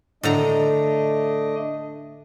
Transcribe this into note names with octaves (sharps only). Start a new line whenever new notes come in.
A2 D3 A3 D4 D#5 A#5